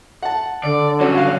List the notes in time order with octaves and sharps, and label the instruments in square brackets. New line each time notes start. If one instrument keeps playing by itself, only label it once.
[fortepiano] F#5 A5
[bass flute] D3 [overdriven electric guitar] D5
[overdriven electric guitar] G2 F#3 [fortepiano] C#4 F#4
[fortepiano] F#4 F5